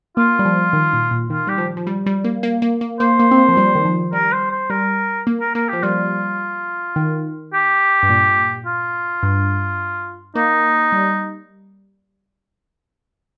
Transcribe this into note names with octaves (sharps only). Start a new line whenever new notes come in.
A#3 F4
G3
F3
D#3
A#2
A#2
D#3 F4
G3 G4
F3
F3
G3
G3
A#3
A#3
A#3
A#3
A#3 C5
A#3
C4
A#3
F3
G3
D#3
F3
G3 A#4
C5
C5
G3 A#4
A#3
A#4
A#3 A#4
F3 G4
G3 F4
D#3
G4
G2
A#2
F4
G2
A#3 D#4
G3